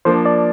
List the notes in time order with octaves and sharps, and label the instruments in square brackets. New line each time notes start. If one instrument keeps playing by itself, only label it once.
[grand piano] F3 A#3 D4 [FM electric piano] C5
[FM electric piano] D5